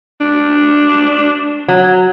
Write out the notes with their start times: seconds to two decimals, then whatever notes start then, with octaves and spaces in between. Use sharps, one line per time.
0.21 D4
1.68 F#3